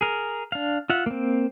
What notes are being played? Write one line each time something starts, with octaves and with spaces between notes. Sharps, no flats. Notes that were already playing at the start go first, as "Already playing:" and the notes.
G#4 A#4
D4 F5
F4 E5 F#5
A#3 C4